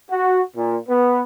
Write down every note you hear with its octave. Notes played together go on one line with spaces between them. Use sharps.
F#4
A#2
B3